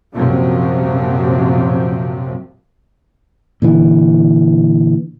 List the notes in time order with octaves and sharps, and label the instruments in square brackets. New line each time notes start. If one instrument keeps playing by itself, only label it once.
[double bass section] A#1 F#2 C3 F3 F#3
[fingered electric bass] A#2 D3 E3